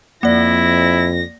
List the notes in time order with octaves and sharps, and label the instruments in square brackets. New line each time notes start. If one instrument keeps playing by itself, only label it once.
[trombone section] F2 [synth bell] A#3 D5 [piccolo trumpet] E4 [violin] A#6